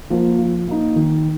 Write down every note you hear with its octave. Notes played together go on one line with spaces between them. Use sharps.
F3 A#3
F3
A#3 D#4
D#3